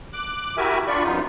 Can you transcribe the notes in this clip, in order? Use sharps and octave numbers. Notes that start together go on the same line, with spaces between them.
D6 F#6
E4 F#4 G4 A#4 E5 G#5
D4 F4 D5 B5 C#6
F#2 C#3 E3 B3 D#4 F4